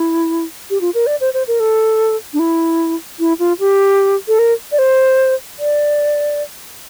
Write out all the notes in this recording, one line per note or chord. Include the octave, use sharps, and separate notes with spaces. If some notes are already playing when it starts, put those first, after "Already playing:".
Already playing: E4
G4
F4
A#4
D5
C5
C5
A#4
A4
D4
E4
E4
F4
G4
A4
A#4
D5
C5
D5